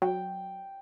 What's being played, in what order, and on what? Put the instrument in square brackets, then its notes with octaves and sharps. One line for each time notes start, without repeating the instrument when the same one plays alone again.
[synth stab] F#3 [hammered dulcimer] G5